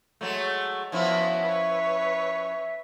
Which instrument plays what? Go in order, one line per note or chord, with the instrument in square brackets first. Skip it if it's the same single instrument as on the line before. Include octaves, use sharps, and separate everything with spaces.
[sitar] F#3 G#3 A3
[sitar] F3 C#4 E4 [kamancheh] B3 F#4 [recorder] E5
[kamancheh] B4 C#5